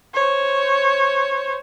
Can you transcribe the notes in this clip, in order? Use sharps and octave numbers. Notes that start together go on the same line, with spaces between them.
C5 C#5